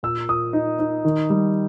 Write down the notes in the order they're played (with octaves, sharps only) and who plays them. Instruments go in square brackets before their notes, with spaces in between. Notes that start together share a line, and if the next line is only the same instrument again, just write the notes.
[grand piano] A#2 E6
A#2 D#6
D#4
D#4
D#3
G3